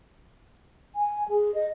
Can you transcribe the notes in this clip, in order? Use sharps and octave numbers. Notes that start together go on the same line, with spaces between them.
G#5
G#4
D#5